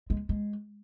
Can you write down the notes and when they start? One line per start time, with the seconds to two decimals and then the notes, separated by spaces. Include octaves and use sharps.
0.10 G#3
0.29 G#3